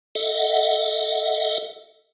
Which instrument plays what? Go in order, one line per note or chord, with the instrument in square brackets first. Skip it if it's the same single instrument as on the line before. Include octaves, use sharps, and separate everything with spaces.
[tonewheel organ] A4 D#5 E5 F#5